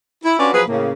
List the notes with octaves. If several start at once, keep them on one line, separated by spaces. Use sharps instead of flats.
E4
C#4 D4 F4 F#4 B4 D5
F3 F#3 G#4 B4
A2 C#3 A#3